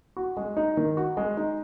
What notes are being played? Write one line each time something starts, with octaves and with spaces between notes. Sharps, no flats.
F#4
G#3
D#4
D#3
F#4
G#3
D#4